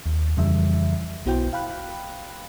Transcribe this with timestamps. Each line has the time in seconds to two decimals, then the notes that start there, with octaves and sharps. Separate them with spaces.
0.06 D#2
0.37 F2 C#3 E3 G3 E5
1.26 B1 B3 E4 F#4 C5 G5
1.53 F5 G5 B5 F#6